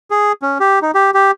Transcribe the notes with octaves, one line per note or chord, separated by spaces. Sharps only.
G#4
C#4
G4
D#4
G4
G4